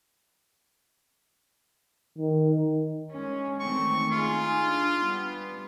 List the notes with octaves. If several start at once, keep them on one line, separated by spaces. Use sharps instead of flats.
D#3
G#3 C#4
D#3 A3 C4 C#6
D#4 F4 G#4
D4
G3 B3